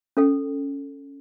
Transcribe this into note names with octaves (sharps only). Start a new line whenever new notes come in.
C#4 A4 G5